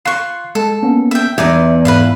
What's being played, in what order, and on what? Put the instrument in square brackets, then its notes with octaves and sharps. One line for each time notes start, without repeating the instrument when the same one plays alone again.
[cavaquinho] F4 C#6 [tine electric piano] F#6 C7
[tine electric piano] G#3 [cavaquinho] A4
[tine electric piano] A#3 B3 C#4
[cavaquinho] E5 G5
[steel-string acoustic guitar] E2 [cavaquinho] D#4 D5 G#5 [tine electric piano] E5 A#5
[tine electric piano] G#2 [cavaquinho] B4 E5 F5